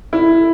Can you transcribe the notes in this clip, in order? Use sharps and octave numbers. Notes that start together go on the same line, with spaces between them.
E4